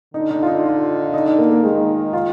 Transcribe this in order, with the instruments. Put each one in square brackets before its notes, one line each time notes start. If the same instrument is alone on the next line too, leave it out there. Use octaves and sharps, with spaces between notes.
[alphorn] D3 [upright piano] D#4
[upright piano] D#4
F4
D#4
F4
D#4
D#4
A#3
A#3
[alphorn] D#3 [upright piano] G#3
[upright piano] F4